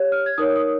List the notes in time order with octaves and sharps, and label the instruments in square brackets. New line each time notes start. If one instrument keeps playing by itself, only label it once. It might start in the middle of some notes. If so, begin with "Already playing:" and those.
Already playing: [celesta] G4 C#5
F6
G#6
D#4 A#4 C#5 D#6
D#6